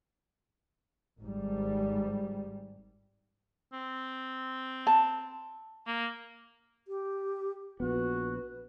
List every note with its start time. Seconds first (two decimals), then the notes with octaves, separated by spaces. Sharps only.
1.20 G#1 G#2 G3
3.73 C4
4.87 A5
5.87 A#3
6.88 G4
7.80 A#1 B3 F#4 B4